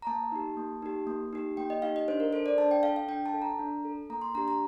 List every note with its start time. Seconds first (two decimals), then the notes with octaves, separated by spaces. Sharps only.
0.02 A#5
0.07 A#3 A5
0.32 D#4 G4
0.57 A#3
0.82 D#4 G4
1.07 A#3
1.33 D#4 G4
1.57 A#3 G5
1.70 D#5
1.82 D#4 G4 F5
1.96 D#5
2.08 D4 C5
2.20 A#4
2.33 A4 C5
2.46 D5
2.58 D4 A5
2.71 G5
2.83 A4 F5
2.96 F5
3.08 D4 G5
3.26 A5
3.34 A4
3.42 A#5
3.59 D4
3.85 A4
4.10 A#3 A#5
4.22 C6
4.35 D4 G4 A#5
4.48 A#5